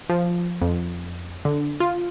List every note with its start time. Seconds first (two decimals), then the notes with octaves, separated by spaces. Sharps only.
0.09 F3
0.61 F2
1.45 D3
1.80 F4